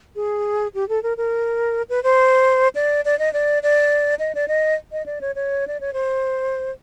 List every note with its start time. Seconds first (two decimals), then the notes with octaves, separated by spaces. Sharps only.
0.16 G#4
0.75 G4
0.89 A4
1.03 A#4
1.17 A#4
1.90 B4
2.03 C5
2.75 D5
3.05 D5
3.19 D#5
3.33 D5
3.63 D5
4.19 D#5
4.35 D5
4.48 D#5
4.92 D#5
5.06 D5
5.21 C#5
5.36 C#5
5.68 D5
5.81 C#5
5.93 C5